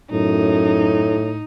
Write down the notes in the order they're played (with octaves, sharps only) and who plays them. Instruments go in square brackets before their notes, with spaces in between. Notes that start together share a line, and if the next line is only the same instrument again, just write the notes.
[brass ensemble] F#2 [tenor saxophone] A2 [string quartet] D#4